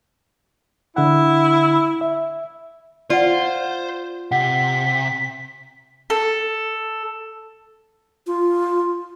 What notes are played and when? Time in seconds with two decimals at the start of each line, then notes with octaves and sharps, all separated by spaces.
0.96 D3 E4 F#5
2.01 E5
3.10 F4 C5 D5 F#5
4.31 C3 F#5 B6
6.10 A4
8.27 F4